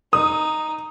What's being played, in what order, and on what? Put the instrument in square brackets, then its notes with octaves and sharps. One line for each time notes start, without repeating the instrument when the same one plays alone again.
[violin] D#4 [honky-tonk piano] D#6